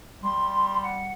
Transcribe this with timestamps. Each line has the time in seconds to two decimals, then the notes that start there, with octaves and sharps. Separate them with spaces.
0.23 G3 C6
0.83 F#5